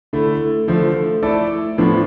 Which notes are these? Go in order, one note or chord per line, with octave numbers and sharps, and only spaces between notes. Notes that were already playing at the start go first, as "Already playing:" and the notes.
D3 A3 E4
D3 F3 A3
A3 E4 A4 D5
A2 F3 B3 D4